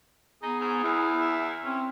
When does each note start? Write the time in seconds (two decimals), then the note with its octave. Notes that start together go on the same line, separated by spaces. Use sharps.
0.43 B3 D#4 G#4
0.61 G#2
0.83 E2 E4
1.21 E5
1.64 C4 C#4